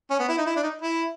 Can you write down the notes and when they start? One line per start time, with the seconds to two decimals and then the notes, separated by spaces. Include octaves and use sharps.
0.11 C#4
0.20 B3
0.28 E4
0.38 D#4
0.46 E4
0.56 D4
0.63 D#4
0.82 E4